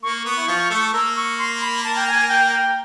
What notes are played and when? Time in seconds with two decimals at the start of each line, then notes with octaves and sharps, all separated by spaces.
0.02 A#3 C#6
0.25 B3
0.37 E4
0.48 F3 F4
0.70 A3 A4
0.93 A#3 A#4 E6
1.16 C#6
1.39 C6
1.61 B5
1.84 A5
1.96 G5
2.07 G#5
2.29 G5
2.52 G5